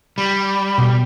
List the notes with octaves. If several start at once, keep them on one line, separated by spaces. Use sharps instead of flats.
G3 B5
B2